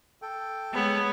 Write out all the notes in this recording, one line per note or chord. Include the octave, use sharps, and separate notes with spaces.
A4 G5
G#3 B3 C#5